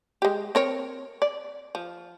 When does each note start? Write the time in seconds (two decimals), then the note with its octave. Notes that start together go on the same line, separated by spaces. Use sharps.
0.22 G#3 G4
0.55 C4 A#4 C#5
1.22 D5
1.75 F3